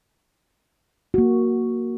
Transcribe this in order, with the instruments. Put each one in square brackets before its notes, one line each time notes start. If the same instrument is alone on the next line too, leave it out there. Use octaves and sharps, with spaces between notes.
[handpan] A#3 F#4